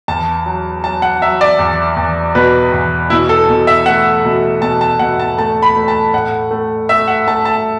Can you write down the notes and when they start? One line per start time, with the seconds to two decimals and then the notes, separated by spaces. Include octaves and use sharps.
0.08 E2 A5
0.46 F#3
0.83 F#3 A5
1.02 F#5
1.22 F#3 E5
1.41 D5
1.59 E2
1.97 E2
2.35 B2 B4
2.72 E2
3.10 B2 E4
3.29 A4
3.49 B2
3.67 E5
3.86 A3 F#5
4.24 B2
4.62 B2 A5
4.81 A5
4.99 B2 F#5
5.20 A5
5.38 A3 A5
5.62 B5
5.76 A3
5.88 A5
6.13 A2 F#5
6.51 A3
6.89 A3 E5
7.08 F#5
7.27 A3 A5
7.45 A5